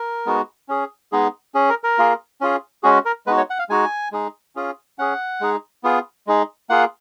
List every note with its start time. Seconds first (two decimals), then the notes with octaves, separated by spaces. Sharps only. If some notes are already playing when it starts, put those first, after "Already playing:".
Already playing: A#4
0.26 G#3 B3 D#4 F#4
0.69 C#4 G#4
1.12 G#3 B3 D#4 G#4
1.55 C#4 G#4
1.69 A#4
1.84 A#4
1.99 A#3 F4 G#4
2.41 C#4 F4 G#4
2.83 G#3 C#4 F#4 G#4
3.05 A#4
3.27 G#3 B3 D#4 F#4 B4
3.37 C#5
3.50 F#5
3.59 F5
3.69 G#3 D#4 F#4 G#5
4.12 G#3 D#4 G#4
4.56 C#4 F4 G#4
4.99 C#4 G#4 F#5
5.41 G#3 D#4 G#4
5.84 B3 F4 G#4
6.27 G#3 D#4 G#4
6.70 A#3 F4 G#4 F#5